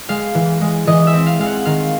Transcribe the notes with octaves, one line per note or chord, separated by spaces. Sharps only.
G#3 F5
E3
G#3
E3 D#5
E5
C4
F5
G#3 F5
F#5
D#3 F5